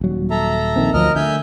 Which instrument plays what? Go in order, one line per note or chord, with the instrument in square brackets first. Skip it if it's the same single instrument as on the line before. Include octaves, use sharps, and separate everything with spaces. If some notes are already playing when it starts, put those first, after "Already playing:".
[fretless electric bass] D#1 F#3
[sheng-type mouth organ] A4 E5 A#5
[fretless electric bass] A#1 D#3 C4
[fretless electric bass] D2 F3 F#3 [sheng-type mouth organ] A#4 D#5 F6
[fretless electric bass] D3 A3 [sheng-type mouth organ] E5 G#5 G6